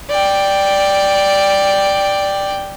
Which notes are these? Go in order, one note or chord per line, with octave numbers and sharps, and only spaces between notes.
D5 G5